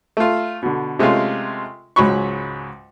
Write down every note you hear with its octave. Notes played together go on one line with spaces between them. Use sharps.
A3 F4
B2 D3
C3 G#3 A3 C#4 F4
C#2 G#2 F#3 B5 C#6